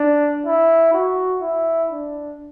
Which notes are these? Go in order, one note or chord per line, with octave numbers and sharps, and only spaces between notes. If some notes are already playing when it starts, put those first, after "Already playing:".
Already playing: D4
E4
F#4
E4
D4